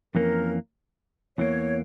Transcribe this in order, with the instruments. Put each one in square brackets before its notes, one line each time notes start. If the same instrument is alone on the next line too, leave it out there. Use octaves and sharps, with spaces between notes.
[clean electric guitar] F2 E3 A#3 C#4 [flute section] A#4
[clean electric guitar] E2 E3 A#3 [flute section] C#5